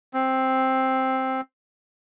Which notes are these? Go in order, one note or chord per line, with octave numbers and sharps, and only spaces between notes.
C4